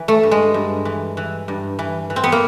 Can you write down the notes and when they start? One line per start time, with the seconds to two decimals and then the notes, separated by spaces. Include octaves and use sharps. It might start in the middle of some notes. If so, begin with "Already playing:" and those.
Already playing: E3
0.08 A3
0.23 G2
0.31 G#3
0.54 G2
0.85 E3
1.17 E3
1.48 G2
1.79 E3
2.10 E3
2.16 C4
2.24 B3
2.32 A#3